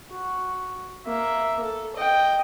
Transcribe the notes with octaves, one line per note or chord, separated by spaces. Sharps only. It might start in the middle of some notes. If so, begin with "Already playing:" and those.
F#4
A#3 E5
A4
D#5 G5